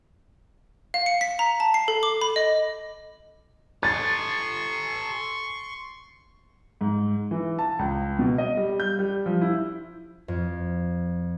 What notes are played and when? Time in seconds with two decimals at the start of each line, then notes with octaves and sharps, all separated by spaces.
0.94 F5
1.06 C#7
1.21 B6
1.39 A#5
1.60 A5
1.74 C7
1.88 A4
2.03 D6
2.21 B5
2.36 D#5
3.83 A4 G#5 C6 C#6 A6
6.81 G#2
7.31 E3
7.59 A5
7.79 C#2
8.19 B2
8.38 D#5
8.57 G3
8.80 G6
8.99 G3
9.26 F3
9.41 E4
10.28 F2